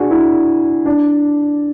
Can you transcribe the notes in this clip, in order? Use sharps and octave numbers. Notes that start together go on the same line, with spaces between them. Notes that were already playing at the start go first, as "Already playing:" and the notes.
Already playing: D4 F#4 G#4
E4
D4